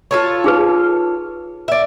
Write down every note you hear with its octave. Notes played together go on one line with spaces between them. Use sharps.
F4 A4 C#5
D#4 G#4 B4
D5 E5